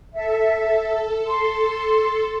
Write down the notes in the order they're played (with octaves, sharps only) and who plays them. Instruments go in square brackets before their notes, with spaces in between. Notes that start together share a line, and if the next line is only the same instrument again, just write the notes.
[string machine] A4 [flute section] E5
[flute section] C6